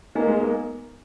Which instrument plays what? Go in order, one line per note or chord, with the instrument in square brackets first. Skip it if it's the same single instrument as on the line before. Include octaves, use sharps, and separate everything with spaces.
[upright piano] A#3 [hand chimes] B3 D#4 A#4 D#5 G#5
[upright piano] G#3
A#3